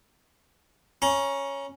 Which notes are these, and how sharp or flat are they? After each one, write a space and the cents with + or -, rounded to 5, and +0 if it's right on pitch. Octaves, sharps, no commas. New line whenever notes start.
C#4 +0 A#5 +30